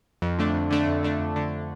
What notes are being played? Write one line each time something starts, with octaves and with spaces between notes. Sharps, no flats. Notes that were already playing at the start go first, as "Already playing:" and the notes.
F2
D3 A3 D4
F2
D3 A3 D4
F2
D3 A3 D4
F2
D3 A3 D4